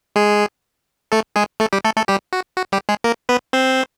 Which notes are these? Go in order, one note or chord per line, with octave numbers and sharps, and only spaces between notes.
G#3 G#4
A3 A4
G#3 G#4
A3 A4
G3 G4
A3 A4
A3 A4
G3 G4
F#4
F#4
G3 G4
G#3 G#4
A#3 A#4
B3 B4
C4 C5